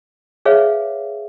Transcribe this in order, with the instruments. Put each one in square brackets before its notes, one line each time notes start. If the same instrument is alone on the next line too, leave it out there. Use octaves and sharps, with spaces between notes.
[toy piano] G#4 B4 C#5 E5 F5